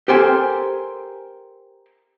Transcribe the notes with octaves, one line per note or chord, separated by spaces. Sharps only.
G4 A4 A#4 C5 G5 G#5